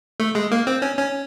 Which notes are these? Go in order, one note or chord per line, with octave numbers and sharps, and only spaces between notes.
A3
G#3
A#3
C4
C#4
C#4